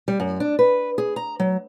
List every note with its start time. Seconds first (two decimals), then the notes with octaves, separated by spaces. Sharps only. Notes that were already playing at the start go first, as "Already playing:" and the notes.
0.08 G3
0.20 F#2
0.40 D4
0.59 B4
0.98 G#4
1.16 A#5
1.40 F#3